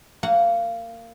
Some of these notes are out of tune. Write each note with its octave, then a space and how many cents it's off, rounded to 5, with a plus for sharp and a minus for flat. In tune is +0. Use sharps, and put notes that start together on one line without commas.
A#3 -20 F#5 +0